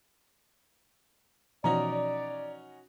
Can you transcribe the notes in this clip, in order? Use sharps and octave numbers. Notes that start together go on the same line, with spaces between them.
B2 E3 F3 C#4 D#4 F#4 D5 A#5